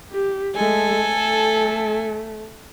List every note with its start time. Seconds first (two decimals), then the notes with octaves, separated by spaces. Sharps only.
0.12 G4
0.55 G#3 A3 A4 G#5
1.10 A3